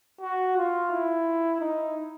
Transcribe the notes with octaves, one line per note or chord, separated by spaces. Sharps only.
F#4
F4
E4
D#4